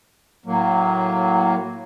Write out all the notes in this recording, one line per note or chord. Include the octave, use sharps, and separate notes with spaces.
A2 F#3 A#3